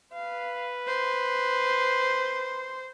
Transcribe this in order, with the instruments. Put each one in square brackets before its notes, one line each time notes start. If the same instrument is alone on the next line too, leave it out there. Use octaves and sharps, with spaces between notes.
[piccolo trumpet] B4 [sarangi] F5
[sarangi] C5